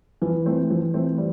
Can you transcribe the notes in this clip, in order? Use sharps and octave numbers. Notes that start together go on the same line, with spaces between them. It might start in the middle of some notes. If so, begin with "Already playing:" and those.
E3 F3
A3 C4
F3
A3 C4
G3